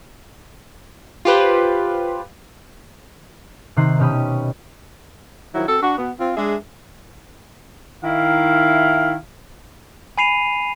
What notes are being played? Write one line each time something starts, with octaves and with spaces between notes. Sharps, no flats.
F4 G4 B4 C5
C3 D#3 A#5 C6 F#6 C7
B2 C#4 G4 B5 D#6
D#3 F3 F#3 E4
C4 F#4 A4
D4 F#4
B2 B3
C4 F4
G#3 D4 G#4 E5
D#3 E4 F5
G#5 B5 C7 D#7 F7